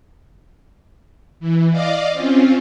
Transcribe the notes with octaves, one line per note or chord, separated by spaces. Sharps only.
E3
D5 D#5 F5 D6
C4 C#4 F4